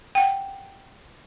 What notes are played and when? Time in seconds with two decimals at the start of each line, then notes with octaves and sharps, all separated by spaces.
0.15 F#5 G5